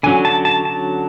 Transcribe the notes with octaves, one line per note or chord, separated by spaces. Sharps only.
D3 F#3 C#4 G#5
A5
A5
A5